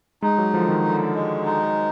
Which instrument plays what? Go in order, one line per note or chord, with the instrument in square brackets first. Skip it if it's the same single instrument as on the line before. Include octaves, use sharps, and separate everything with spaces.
[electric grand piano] G#3 [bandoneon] D#4
[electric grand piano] F#3
[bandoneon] D3 [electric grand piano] F3
[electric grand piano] D#3
[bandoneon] D3
G#3
D#4